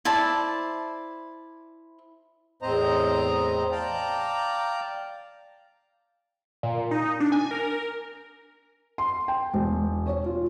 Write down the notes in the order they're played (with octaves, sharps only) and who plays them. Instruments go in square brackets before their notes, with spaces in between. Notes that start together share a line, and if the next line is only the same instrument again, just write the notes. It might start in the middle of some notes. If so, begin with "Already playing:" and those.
[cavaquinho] E4 C5 D5 A5
[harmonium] E2 A2 C4 C5 D#5 A#5
D5 F5 G5 A5 A#5
[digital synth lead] A#2
D#4
D4
G#5
A#4
[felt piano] C6
G5
E1
C#5
F4